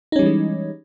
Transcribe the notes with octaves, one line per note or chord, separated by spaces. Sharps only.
E3 G3 G#3 C#4 D#4